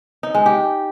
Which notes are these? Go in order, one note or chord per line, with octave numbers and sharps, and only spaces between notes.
D#4
G#3
G4